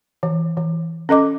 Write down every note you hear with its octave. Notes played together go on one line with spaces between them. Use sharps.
E3
E3
C#4 A4 D#5 D6